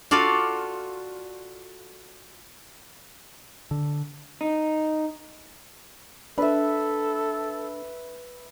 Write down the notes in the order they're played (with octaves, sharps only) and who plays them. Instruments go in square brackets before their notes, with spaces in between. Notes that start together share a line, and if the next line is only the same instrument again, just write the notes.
[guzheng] F4 F#4 A4 D5 F5
[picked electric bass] D3
[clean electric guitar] D#4
[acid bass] D4 [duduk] A4 [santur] B4 E5